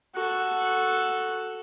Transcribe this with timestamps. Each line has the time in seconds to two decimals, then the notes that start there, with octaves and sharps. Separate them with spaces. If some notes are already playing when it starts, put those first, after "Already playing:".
0.15 F#4 A4